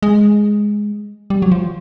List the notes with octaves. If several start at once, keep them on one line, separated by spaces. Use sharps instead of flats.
G#3
G3
F#3
F3